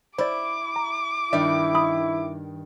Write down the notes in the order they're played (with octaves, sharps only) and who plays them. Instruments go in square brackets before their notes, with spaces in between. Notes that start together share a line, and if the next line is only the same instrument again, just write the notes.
[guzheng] E4 [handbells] C5 D5 [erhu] D6
[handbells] A#5
[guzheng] G2 D#3 [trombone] E4 [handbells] D5 E5
[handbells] B5 D#6